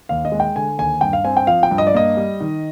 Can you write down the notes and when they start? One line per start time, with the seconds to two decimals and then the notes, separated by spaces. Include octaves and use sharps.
0.09 D#2 F5
0.25 D#5
0.32 G#3
0.40 G5
0.56 D3 G#5
0.78 D#2 G#5
1.01 G2 G5
1.13 F5
1.24 C4 G#5
1.37 G5
1.47 F3 F5
1.63 G5
1.71 G2
1.78 D#5
1.87 D5
1.94 A#3 D#5
2.17 G3
2.40 D#3